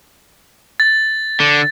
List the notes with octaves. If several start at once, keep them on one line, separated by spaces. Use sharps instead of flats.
A6
D3